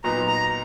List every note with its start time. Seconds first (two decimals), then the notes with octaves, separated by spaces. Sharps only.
0.04 A#2 F#3 B3 D#4 A#5
0.28 A#5